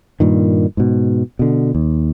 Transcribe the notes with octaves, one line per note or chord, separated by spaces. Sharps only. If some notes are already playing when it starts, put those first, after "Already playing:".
G2 A#2 D#3
G#2 B2
B2 D3
D#2